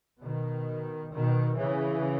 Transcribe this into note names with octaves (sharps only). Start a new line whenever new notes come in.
B2 D#3
B2 D#3
C#3 E3